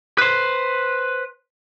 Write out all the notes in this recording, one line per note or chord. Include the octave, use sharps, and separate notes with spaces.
B4 C5